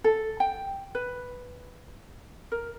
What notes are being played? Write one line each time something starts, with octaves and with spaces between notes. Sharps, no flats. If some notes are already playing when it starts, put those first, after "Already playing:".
A4
G5
B4
A#4